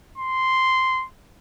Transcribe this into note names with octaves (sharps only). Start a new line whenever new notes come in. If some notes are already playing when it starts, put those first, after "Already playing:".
C6